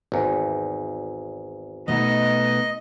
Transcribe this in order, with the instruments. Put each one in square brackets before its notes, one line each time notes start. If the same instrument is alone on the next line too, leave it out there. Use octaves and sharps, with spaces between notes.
[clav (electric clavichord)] G#1 E2
[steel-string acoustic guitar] B2 A3 B3 [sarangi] D#4 [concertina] D#5